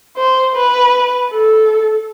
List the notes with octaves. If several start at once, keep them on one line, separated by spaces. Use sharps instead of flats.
C5
B4
A4